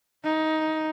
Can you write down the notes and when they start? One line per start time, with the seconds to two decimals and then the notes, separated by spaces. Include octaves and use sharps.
0.23 D#4